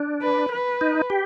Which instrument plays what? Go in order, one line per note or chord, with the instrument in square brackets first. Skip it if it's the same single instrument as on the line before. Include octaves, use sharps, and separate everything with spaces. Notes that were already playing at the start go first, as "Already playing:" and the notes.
Already playing: [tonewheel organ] D4
[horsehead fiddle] B4
B4
[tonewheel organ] D#4
G4